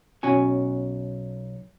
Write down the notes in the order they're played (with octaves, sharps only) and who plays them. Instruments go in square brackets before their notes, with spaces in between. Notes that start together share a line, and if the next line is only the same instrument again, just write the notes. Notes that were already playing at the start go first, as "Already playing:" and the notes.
[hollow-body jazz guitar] B1 C#4 F#4 G#5